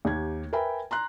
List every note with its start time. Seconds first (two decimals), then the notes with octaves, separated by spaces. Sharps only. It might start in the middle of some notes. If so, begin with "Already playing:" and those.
0.05 D#2 G4 G#6
0.53 A#4 B4 E5 G5 G#5 B5
0.91 A#5 C6 F#6